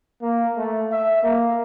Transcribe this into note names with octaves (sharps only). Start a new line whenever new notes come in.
A#3
A3
E5
A#3